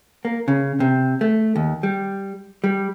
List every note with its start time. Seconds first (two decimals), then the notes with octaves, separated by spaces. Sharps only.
0.25 A#3
0.48 C#3
0.80 C3
1.21 A3
1.56 D#2
1.83 G3
2.64 G3